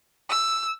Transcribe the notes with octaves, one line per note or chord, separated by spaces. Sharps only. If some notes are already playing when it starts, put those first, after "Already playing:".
E6